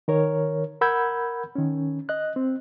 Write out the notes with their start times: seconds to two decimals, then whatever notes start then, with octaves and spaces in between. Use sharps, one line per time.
0.08 D#3 A#4 C#5
0.81 A#4 F#5 B5 E6 G6 G#6
1.55 D#3 C#4
2.09 D#5 F#6
2.36 C4